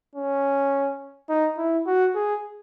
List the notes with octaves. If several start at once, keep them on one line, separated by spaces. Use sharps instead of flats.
C#4
D#4
E4
F#4
G#4